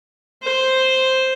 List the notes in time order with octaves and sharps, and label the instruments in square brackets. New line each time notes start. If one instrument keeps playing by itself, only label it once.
[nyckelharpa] C5